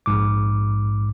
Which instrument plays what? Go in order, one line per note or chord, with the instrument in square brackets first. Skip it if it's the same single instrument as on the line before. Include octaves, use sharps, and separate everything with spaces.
[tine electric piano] A#1 G#2 D6